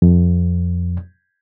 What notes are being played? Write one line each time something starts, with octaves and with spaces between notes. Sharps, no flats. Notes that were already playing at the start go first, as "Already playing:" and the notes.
F2